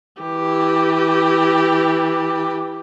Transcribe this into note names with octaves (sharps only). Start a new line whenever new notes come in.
E3 G4